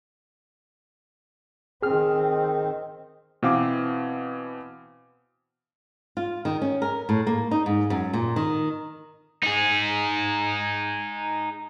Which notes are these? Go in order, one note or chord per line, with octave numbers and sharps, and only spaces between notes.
D#3 C4 G#4 F6
B2 E3 C4 F5 D6
F4
D#3
C#4
A#4
A2
A#3
D#4
G#2
F#2
A#2
D#3
D#4 G#4